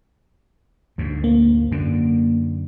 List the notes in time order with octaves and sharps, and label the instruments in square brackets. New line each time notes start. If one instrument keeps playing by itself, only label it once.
[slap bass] D2 G#2
[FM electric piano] A#3
[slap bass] F#2 D3